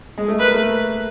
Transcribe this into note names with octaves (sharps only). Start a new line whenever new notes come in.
G#3
A3
A#3 B4
A3